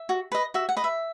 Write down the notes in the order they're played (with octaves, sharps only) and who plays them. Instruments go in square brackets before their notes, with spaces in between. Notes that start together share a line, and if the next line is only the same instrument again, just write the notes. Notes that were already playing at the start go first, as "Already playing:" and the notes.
Already playing: [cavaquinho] E5
F#4
B4 D#5
F#4 E5
F#5
B4 D#5
E5